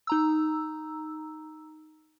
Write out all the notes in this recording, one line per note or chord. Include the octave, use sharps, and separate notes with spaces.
D#4 A#5 E6